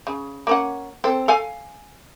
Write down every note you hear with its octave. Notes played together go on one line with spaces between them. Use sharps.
C#3
A#3 C#4 F#5
C4 A4
A4 F5 G#5